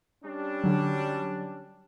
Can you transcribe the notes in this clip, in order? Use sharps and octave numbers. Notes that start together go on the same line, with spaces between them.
G3 C#4 D4
D3 F#3